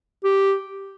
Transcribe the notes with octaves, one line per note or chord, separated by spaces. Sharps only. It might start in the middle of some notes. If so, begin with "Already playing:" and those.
G4